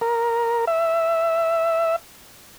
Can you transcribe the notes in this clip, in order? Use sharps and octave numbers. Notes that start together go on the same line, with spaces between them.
A#4
E5